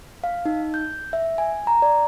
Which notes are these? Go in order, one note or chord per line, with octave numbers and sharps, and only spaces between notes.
F5
D#4
G6
E5
G#5
A#5
D5